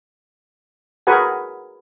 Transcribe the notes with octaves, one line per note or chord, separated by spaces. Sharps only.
F#4 G#4 A#4 B4 F#5 G#5